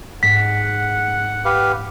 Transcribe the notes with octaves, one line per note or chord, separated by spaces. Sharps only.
G#2 F#5 B6
G4 B4 F5